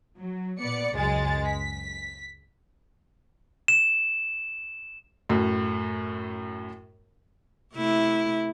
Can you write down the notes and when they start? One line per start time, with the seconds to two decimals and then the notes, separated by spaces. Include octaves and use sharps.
0.18 F#3
0.60 A#2 B3 D5 C#7
0.95 C#2 F#2 G#3 A6
1.49 B6
3.68 E7
5.29 F#2 A2
7.74 C3 A3 E4